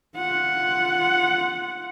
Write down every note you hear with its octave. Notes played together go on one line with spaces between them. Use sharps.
F4 F#5